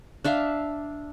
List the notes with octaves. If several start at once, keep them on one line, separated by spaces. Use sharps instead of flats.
D4 E5 F5